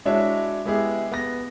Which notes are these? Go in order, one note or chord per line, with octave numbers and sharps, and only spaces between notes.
G#3 D4 E4 F#4 C#5 E5
G#3 B3 E4 G4 G#4
B3 A#6